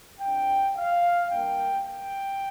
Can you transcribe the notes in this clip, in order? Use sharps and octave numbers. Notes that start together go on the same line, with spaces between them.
F2 F3 D4 G5
F5
G2 G3 A#3 D4 G5
G5